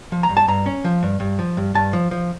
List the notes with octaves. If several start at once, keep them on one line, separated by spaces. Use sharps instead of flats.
F3
A#5
G2
A5
G2 A#5
C#4
F3
G2
G2
F3
G2
G2 A5
F3
F3